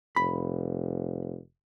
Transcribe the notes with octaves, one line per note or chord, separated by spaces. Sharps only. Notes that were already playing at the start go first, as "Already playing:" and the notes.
F1 B5